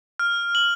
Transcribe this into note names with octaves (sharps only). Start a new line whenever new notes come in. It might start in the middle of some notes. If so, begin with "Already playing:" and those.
F6
F#7